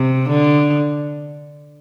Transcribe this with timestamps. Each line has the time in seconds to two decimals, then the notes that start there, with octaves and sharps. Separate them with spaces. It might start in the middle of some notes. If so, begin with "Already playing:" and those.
Already playing: C3
0.28 D3